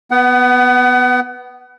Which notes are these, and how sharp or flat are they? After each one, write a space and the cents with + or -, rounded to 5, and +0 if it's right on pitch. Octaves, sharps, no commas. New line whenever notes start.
B3 +0 F#5 +30